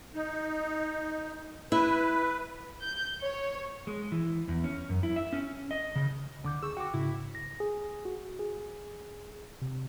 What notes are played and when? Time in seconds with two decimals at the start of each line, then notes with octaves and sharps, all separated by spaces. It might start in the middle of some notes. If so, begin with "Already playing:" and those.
0.15 D#4
1.72 E4 B4
2.82 G6
3.22 C#5
3.87 G#3
4.12 E3
4.48 E2
4.64 C#4
4.89 F#2
5.03 E4
5.16 E5
5.33 C#4
5.71 D#5
5.96 C#3
6.44 D2 D3 D6 G6
6.63 G#4 C#6 E6
6.77 F#4 G5 D6
6.94 G#2 C#3 E4
7.35 A#6
7.60 G#4
8.05 F#4
8.39 G#4
9.62 C3